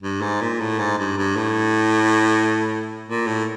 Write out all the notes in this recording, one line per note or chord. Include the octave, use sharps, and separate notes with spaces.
G2
G#2
A#2
A2
G#2
G2
G2
A2
A#2
A2